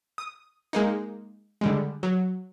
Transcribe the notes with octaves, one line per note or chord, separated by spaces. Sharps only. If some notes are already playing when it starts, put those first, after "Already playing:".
D#6
G#3 A#3 D#4
D3 G3 G#3
F#3